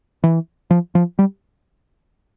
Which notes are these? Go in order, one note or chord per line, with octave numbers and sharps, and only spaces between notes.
E3
F3
F3
G3